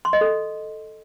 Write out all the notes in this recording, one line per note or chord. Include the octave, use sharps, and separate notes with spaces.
C6
D#5
A4